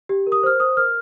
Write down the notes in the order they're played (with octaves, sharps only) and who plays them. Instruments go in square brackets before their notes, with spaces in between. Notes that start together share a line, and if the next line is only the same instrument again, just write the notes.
[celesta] G4
A#4
D#6
C5 F6
C5 D#6
A#4 F6